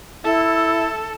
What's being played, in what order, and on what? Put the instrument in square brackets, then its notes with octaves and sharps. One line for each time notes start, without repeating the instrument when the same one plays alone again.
[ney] E4 [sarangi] A4